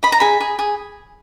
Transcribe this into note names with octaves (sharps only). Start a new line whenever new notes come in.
D#5 B5
A#5
G#4 B5
G#4
G#4